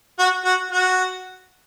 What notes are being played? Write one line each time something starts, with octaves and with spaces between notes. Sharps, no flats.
F#4
F#4
F#4